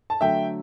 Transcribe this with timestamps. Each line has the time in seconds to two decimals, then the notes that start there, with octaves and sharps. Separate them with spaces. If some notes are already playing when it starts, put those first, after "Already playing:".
0.10 A5
0.21 D3 F#3 A3 E5 G5